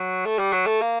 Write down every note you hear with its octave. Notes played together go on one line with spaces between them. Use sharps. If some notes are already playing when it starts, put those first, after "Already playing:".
Already playing: F#3
A3
G3
F#3
A3
A#3